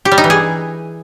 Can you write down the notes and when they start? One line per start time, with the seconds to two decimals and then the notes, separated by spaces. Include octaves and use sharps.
0.05 G4
0.12 G3
0.18 D#4
0.24 E3
0.30 G#4